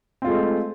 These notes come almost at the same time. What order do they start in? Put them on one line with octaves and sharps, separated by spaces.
C4 F4 G#3 A3